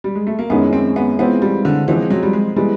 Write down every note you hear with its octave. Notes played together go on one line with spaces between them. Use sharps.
G3
G#3
A3
A#3
F#2 D#3 G#3 B3 C#4 E4
C4
B3
E3 G#3 B3 C4 F4
G3
D3
E3 F3 G#3 C4
F#3
G3
G#3
E3 G3 G#3 B3